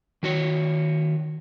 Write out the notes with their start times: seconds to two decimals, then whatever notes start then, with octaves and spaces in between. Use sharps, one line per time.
0.23 D#3 F#4 C#5